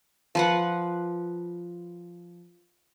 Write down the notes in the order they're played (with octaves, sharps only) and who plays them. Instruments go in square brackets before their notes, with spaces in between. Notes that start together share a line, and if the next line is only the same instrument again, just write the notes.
[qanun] F3 B4 F#5